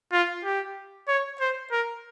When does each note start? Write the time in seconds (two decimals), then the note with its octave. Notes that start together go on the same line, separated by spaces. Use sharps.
0.12 F4
0.45 G4
1.08 C#5
1.41 C5
1.72 A#4